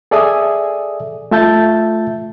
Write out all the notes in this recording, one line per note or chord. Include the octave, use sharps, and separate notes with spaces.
G#4 A4 D5 E5 G#5 D#6
A3 F4 E5 A5 G6 A6